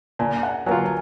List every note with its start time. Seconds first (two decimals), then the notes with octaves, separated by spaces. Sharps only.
0.19 A#2 G#5
0.43 F#5
0.66 F#3 A#3 F4 G#5
0.86 G#5